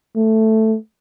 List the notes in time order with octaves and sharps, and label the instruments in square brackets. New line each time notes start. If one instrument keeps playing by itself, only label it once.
[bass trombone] A3